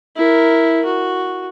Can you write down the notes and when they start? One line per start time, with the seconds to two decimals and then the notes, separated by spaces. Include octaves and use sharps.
0.16 E4 A#4
0.85 F#4